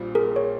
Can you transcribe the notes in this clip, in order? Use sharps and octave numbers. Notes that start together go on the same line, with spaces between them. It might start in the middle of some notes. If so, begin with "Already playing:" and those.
Already playing: A#1 A#2 G3 C4 F4
G#4 A#4
C#5